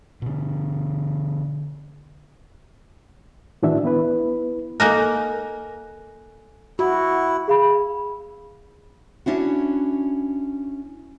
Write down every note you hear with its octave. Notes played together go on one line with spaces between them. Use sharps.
B2 D3
A2 D#3 E3 D4 F#4 E5
B3 E4 B4
A#3 D#4 A4 A#4 G#5 F#6
E4 F#4
G#4 F5 B5
C#4 D4 E4 F#4